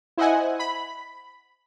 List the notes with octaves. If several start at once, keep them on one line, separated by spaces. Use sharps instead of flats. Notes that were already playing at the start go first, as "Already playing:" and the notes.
E4 C5 D#5 E5 F#5 G#5
B5